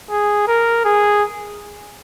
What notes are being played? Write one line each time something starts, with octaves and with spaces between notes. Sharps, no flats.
G#4
A#4
G#4